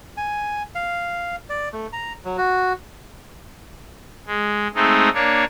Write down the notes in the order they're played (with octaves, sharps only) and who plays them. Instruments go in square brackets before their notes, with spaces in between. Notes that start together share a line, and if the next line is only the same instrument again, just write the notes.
[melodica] G#5
F5
D5
A3
A#5
F#3
F#4
[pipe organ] G#3
G#3 A3 C4 D#4
A#3 D4 C#5